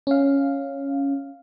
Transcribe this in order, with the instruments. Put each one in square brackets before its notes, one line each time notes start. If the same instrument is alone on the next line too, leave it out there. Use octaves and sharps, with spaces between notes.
[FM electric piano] C#4 F5